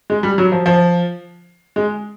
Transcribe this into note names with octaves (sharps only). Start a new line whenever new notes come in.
G#3
G3
F#3
F3
F3
G#3